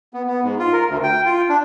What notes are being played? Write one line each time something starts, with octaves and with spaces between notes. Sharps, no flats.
B3
B3
G#2
F4
A#4
D2
G5
F4
D4